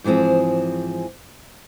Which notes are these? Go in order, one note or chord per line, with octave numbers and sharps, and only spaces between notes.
G#2 E3 F3 C4 G#4